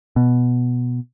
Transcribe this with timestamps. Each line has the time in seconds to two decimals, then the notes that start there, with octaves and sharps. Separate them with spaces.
0.16 B2